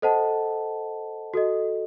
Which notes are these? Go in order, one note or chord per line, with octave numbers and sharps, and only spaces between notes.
A4 C5 D#5 F#5 A5
F#4 A4 D#5